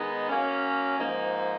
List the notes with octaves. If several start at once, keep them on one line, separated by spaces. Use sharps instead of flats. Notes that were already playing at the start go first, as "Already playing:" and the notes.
Already playing: D#3 G#3 B3 D#4
F#3 A#3 C#4
G#2 F3 A#3 D#4